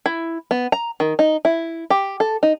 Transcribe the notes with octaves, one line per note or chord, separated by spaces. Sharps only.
E4
B3
A#5
D#3
D#4
E4
G4
A4
D#4